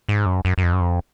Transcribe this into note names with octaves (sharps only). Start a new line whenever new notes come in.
G#2
F#2
F#2
F#2
F2
F#2
F2